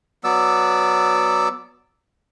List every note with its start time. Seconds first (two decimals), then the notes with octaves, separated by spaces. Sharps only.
0.24 F#3 B3 D5 E6